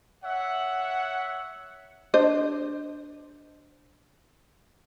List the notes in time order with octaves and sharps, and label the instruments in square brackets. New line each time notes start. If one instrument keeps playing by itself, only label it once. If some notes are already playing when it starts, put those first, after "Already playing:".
[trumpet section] C#5 E5 F#5
[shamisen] D4 C5 D#5